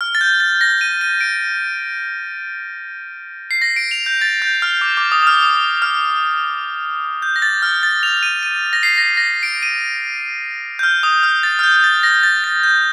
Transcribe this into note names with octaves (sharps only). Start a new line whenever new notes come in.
F6
A6
G6
A6
A#6
D#7
D#7
D7
C7
A#6
D7
F7
G6
A6
G6
F6
D6
D6
D#6
D#6
F6
D#6
F6
G6
A#6
A6
F6
A6
F7
D#7
D#7
A#6
C7
A#6
C7
A#6
C7
D7
D#7
G6
F6
D#6
F6
A6
F6
G6
G6
A6
A#6
A6
A6
G6